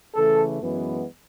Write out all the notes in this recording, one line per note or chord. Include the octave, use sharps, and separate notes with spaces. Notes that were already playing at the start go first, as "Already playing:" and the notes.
C#3 E3 A3 A4
F#2 E3 G#3 B3